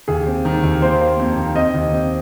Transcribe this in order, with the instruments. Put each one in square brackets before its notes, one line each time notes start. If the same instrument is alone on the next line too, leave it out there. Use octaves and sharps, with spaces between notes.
[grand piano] D#2 [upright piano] G#4
[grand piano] C4
D#3
D#2
[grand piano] A#3 [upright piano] C5
[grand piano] A#3
F2
D#3
[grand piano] C4 [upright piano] D#5
[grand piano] D#2
C4